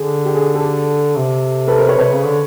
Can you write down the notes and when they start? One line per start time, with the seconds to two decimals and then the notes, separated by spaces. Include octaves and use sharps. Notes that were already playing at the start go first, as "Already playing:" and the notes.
Already playing: D3 G#4
0.26 G4
0.34 G#4
0.54 G4 A4
1.16 C3
1.67 A4 B4
1.77 A#4 C5
1.87 B4 C#5
1.99 C3 B4 C#5
2.11 C#3
2.25 D3